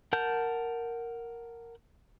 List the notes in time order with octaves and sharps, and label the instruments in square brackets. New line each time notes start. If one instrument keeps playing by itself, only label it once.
[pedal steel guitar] A#4 F#5 A5 G6